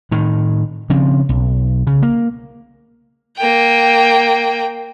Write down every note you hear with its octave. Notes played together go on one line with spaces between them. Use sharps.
A2 D#3
C#3 F3 C4
B1
C#3
A#3
A#3 G5